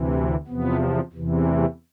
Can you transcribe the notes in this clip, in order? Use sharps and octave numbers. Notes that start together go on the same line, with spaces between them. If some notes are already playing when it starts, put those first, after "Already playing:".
Already playing: D2 C3 E3
A3
E2 C3 F3 B3
E2 C3 E3
A3